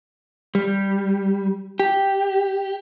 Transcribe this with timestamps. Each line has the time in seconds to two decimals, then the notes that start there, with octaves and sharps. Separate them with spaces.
0.55 G3
1.80 G4